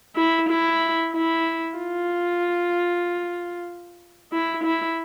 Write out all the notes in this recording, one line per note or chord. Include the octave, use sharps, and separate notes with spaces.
E4
E4
E4
F4
E4
E4